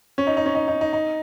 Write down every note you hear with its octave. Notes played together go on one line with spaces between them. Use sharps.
C#4
D#4
D#4
C#4
D#4
D#4
D#4
D#4